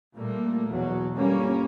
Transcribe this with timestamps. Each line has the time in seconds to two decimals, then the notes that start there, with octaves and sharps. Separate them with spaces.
0.16 A#2 G3 A3 A#3
0.70 E2 B2 F#3
1.14 G1 G3 A#3 C#4